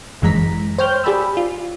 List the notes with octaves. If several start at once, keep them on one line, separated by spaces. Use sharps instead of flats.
G1 F#2 E3 G#3 A#5 B6
C5 C#5 G5 F6 G6
G4 G#4 D5 B5 E6
F4